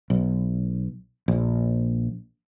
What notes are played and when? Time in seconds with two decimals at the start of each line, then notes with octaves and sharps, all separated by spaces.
0.10 B1
1.28 A#1